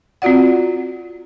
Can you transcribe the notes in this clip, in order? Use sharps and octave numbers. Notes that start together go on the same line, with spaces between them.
C4 F4 F#4 D5 F#5